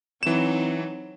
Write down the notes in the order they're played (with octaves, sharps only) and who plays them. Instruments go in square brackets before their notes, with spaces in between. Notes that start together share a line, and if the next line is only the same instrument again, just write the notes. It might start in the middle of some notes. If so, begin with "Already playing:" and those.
[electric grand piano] E3 E7 [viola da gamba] F#3 C4 D#4